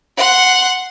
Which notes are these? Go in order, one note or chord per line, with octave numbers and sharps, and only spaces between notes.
F#5 C6